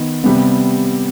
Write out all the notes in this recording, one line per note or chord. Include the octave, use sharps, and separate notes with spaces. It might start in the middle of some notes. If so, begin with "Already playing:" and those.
Already playing: D#3 B3 D#4
C3 G3 B3